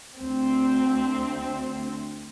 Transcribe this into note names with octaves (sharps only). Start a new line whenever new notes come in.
D2 C4